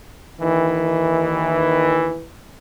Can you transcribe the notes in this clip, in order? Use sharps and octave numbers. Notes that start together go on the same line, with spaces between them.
D#2 D#3 E3